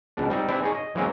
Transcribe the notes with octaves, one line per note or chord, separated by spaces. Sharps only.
C#2 B2 D4
G3 C4 D#4
C4 D4 E4 G4 B4
D#4 G#4 C#5
D#5
E3 F#3 G#3 A#3 C4 C#4